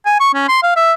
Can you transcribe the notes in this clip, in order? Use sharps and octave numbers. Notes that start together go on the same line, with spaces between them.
G#5
C#6
C#4
C6
F5
E5